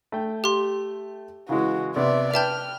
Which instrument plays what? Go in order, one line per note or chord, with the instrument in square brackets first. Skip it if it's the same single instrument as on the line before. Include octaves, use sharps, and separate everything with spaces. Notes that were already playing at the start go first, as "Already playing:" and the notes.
[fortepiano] A3 G5
[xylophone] G4 C6
[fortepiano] C#3 E3 G#3 [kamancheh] F#4
[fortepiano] C3 B3 [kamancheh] D5 E5
[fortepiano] B4 G5 [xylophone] E5 A5 G6 [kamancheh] F6